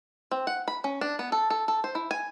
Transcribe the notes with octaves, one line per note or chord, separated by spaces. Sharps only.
C4
F#5
B5
C#4
D4
B3
A4
A4
A4
C5
E4
G#5